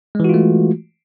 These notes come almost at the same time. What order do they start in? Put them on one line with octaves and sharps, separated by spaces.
G#3 E3 F#4 F4 A3